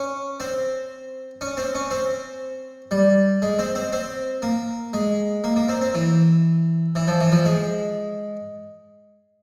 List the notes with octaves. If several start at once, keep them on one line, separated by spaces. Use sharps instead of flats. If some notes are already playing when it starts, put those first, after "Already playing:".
Already playing: C#4
C4
C#4
C4
C#4
C4
G3
G#3
C4
C4
C4
A#3
G#3
A#3
A#3
C4
C4
E3
E3
F3
E3
F3
G#3